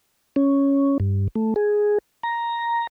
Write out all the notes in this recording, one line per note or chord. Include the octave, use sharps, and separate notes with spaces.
C#4
G2
A3
G#4
A#5